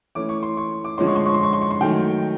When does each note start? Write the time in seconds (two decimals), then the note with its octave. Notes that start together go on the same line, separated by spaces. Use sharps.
0.15 E3 A3 C#4 D6
0.29 C#6
0.43 C6
0.57 C#6
0.84 D6
0.98 D3 F3 G#3 C#4 C6
1.07 C#6
1.16 C6
1.26 C#6
1.34 C6
1.43 C#6
1.53 C6
1.62 C#6
1.71 C6
1.81 D#3 F#3 A3 G5